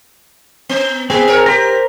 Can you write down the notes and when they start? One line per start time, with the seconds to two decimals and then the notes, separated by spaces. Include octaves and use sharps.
0.69 B3
1.10 A#3 C4 G#4
1.28 A#4 C#5
1.46 G4 A#4 C5 A#5